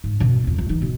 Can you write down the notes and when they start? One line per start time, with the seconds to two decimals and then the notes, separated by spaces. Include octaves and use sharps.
0.04 G#2
0.20 F#2 B2
0.44 F2 C4
0.56 C2 F2
0.69 E3 D#4
0.82 B2